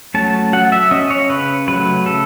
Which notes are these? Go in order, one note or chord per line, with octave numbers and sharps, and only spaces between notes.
F#3 A3 C#4 A5
F#3 F#5
E5
C#4 D#5
C#5
C#3 B4
F#3 A3 B4
C#3 A4